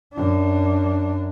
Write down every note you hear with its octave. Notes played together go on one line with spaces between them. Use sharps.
F#2 D4